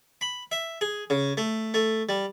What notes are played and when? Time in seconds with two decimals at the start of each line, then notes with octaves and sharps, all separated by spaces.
0.21 B5
0.52 E5
0.81 G#4
1.10 C#3
1.37 A3
1.74 A3
2.09 G3